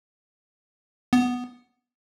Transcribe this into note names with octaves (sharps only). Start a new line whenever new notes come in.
B3